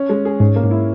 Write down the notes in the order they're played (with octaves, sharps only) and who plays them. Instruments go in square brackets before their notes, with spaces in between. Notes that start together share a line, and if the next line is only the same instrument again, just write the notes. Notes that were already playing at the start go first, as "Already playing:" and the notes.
Already playing: [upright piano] C#4
G#3
G#4
[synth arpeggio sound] G#2 [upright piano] C#4
[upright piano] A#3
[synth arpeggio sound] G#2
[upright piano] E4